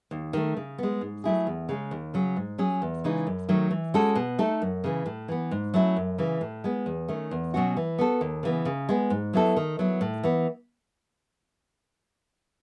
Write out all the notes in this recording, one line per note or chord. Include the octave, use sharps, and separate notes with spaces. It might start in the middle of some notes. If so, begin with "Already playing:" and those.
D#2
D#3 A3
C#3
G#3 B3
G#2
F#3 A3 E4 G#4
E2
C#3 G#3 C#4
D#2
C#3 F#3 C#4
G#2
F#3 C#4 G#4
E2
C#3 E3 G#3 D#4
F#2
D#3 F#3 A3
E3
G#3 C#4 F#4 A4
B2
A3 D#4 A4
F#2
C#3 E3
A2
E3 B3
G#2
F#3 A3 C#4 E4
F#2
C#3 E3
A2
G#3 B3
E2
D#3 A3 C#4
E2
B2 F#3 C#4 F#4
E3
B3 F#4 A4
D#2
C#3 E3 B3
C#3
G#3 B3
G#2
F#3 B3 E4 A4
D#3
F#3 B3 E4
A2
E3 B3